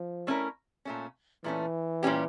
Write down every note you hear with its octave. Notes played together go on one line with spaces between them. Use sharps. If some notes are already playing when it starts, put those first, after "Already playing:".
Already playing: F3
A3 C#4 E4 A#4
A#2 A3 C#4
A#2 E3 A3 C#4
A#2 G3 C#4 G4